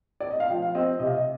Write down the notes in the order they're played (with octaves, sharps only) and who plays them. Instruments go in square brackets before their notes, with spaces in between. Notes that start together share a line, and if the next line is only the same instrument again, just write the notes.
[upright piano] D5
D#5
F5
F3 G5
F5
C4 D#5
C3 D#5
F5
D#5